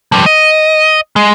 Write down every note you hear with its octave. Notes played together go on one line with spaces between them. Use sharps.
F3 G3
D#5
G#3